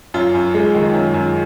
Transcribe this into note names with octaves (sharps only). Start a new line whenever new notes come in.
F#2 F4
F#2
G#3
D#3
F#2
F#2